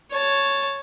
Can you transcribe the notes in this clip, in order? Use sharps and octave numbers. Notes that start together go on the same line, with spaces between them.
C#5 A5